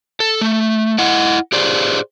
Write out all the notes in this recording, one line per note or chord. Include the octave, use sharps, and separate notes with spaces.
A4
A3
E4 D#5 F#5
G4 G#4 C5 D5